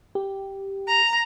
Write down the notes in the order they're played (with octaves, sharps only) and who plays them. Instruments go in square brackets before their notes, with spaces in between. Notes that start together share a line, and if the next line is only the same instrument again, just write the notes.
[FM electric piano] G4
[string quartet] A#5